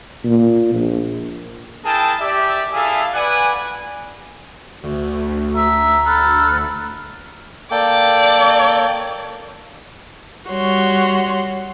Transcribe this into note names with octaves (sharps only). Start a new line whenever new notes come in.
A#2
A#1
E4 G#4 A#4 G5 A5
G4 D5 E5
E4 G#4 A4 E5 F5 G#5
B4 D5 F#5 G#5
D2 A3 F#4
E5 A#5
A4 B5 F6 F#6
A#3 A4 D5 G5
G3 F#4 C#5 C6